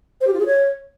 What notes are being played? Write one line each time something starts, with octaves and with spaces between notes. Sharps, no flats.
C5
G4
F4
G#4
C#5